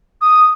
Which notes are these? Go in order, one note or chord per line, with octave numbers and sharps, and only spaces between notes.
D#6